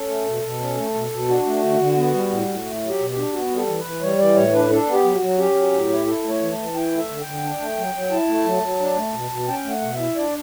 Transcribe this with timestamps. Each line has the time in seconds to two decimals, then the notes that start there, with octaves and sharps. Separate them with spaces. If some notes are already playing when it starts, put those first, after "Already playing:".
Already playing: C#4 A4
0.09 A3
0.26 B2
0.43 B2
0.60 C#4
0.77 A3
0.94 B2
1.11 B2
1.28 D4 F#4
1.46 A3
1.63 D3
1.80 D3
1.97 B3
2.14 G3
2.31 A2
2.47 A2
2.65 A3
2.82 F#3
2.87 G4
2.99 B2
3.11 G4
3.16 D4
3.33 B3 F#4
3.50 G3
3.56 A4
3.67 E3
3.79 B4
3.84 E3
4.02 G3 C#5
4.19 E3 D5
4.35 A2 C#5
4.53 D4 B4
4.70 D4 A4
4.87 B3
4.93 G4
5.04 F#3
5.15 F#4
5.21 F#3
5.38 C#4 G4
5.55 F#3
5.72 A2
5.89 E4
6.06 E4 A4
6.24 A3
6.29 C#5
6.41 E3
6.52 A5
6.58 E3
6.75 E4 G5
6.92 A3
6.97 E5
7.09 D3
7.21 D3 G5
7.43 D4
7.60 A3
7.77 F#3
7.94 F#3
8.11 E4 A5
8.28 A3
8.45 F#3
8.62 F#3
8.80 D4
8.96 A3
9.14 B2
9.31 B2
9.48 C#4 G5
9.65 A3
9.71 F#5
9.82 B2
9.93 E5
9.99 E4
10.16 D4 D5